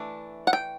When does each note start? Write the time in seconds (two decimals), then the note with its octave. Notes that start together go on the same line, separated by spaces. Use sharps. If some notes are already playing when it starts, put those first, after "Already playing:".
Already playing: E3 A3 D4
0.47 F#5
0.53 G5